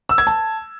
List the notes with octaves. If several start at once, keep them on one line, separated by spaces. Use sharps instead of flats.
E6
G#6
A5